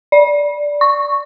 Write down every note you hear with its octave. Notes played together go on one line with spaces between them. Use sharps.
D5
C#6